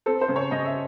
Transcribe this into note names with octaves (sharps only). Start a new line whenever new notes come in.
C4 A4
C5
C#3
C#5
C#3 D#5
E5